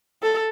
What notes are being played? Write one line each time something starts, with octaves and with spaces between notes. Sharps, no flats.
A4